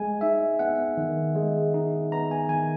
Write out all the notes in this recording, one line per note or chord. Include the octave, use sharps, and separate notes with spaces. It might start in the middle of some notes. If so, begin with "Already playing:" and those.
Already playing: G#3 G#5
D#4 E5
B3 F#5
D#3
G#3
D#4
B3 A#5
G#5
D#3 G#5